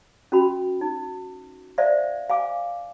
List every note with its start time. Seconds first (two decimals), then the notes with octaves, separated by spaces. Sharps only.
0.32 C#4 F#4 B5
0.81 D#4
1.78 C5 D5 E5 F5
2.29 F5 G#5 D6